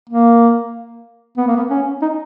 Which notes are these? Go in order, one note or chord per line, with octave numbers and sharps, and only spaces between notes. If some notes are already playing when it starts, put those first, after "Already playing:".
A#3
B3
A#3
B3
C#4
D#4